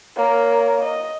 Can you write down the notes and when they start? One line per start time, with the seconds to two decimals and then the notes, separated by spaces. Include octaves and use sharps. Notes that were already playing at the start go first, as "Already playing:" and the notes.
0.16 A#3 A#4 C#5
0.83 D#5